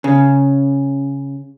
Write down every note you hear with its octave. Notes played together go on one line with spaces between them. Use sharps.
C#3